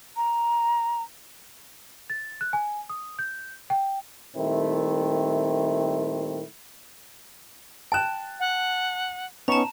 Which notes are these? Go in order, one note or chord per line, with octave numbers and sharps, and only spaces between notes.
A#5
A6
F#6
G#5
D#6
G6
G5
A#2 D#3 G3 A3 C4 E4
G5 A5 F#6 E7
F#5
B3 C#4 D#4 A5 A#5 C#6